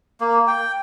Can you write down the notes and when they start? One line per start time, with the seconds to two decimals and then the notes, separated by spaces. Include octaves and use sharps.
0.21 A#3
0.47 G5